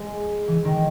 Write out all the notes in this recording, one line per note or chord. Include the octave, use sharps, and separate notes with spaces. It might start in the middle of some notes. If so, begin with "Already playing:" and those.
Already playing: G#3
E3
D#3